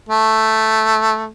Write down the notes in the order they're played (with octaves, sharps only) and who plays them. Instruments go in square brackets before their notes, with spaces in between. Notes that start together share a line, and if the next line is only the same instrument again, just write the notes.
[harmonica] A3